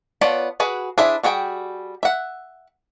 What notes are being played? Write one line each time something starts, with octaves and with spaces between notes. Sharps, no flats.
B3 F4 C#5 D5 A5
F#4 G#4 B4
D4 E4 G#4 C5 E5
G3 F#4 G#4 G5
E5 F#5